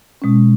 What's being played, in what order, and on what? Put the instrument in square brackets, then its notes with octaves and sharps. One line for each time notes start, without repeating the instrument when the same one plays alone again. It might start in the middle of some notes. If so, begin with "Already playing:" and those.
[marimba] B2 G#3 C#4